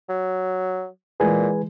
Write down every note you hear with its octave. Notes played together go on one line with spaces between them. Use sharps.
F#3
A#2 E3 G#3 G#4 B4 G#5